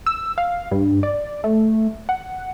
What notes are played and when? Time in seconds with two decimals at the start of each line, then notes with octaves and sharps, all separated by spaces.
0.06 E6
0.38 F5
0.71 G2
1.03 D5
1.44 A3
2.09 F#5